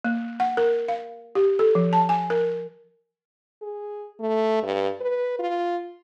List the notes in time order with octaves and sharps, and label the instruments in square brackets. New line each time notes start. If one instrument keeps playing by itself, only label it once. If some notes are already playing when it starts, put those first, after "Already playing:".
[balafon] A#3
F#5
A#4
F5
G4
A4
F3
A5
G#5
A#4
[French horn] G#4
A3
G2
B4
F4